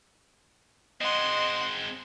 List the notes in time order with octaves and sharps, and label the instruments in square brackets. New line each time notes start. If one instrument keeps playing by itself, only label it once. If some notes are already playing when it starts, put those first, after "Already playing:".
[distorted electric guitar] G#3 C4 [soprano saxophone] D#5 [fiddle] F#5 C6